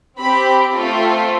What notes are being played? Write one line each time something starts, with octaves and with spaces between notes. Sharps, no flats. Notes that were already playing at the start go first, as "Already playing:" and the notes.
C4 G4 B5
A3 C4 F4 A4